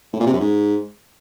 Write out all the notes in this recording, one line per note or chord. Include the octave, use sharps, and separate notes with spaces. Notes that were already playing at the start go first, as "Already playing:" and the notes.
A2
A#2
C3
F#2
G#2